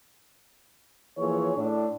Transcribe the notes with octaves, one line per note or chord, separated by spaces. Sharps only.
E3 F3 A#3 G#4 C#5
A2 D4